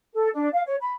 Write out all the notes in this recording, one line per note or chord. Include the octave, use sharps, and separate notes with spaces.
A4
D4
F5
C#5
B5